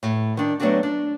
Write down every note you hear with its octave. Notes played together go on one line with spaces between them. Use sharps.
A2
D#3 D4
F#3 A3 B3 C4 D4 F#4
D4